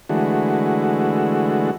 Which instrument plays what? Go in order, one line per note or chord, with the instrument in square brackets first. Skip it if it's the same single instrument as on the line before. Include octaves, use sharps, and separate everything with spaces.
[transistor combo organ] D3 E3 G#3 A3 F#4